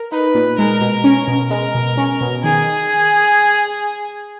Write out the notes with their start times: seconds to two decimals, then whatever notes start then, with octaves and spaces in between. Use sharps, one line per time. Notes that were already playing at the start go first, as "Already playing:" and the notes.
Already playing: A#4
0.12 D#4 B4
0.34 A#2
0.58 G#3 A#4
0.81 B2
1.04 C#4
1.28 B2
1.50 G#3 A#4
1.75 B2
1.97 C#4
2.21 B2
2.44 D#3 G#4